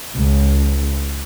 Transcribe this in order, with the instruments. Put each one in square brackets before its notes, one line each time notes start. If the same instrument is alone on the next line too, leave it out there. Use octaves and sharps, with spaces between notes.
[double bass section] C#2